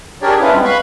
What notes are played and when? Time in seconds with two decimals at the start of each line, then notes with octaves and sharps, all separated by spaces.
0.22 D4 G4 G#4 A#4 C#5 D5
0.40 C#4 D4 E4 F4 B4
0.52 G3 G#3 B3 C4
0.65 B4 F5 B5 C#6 F#6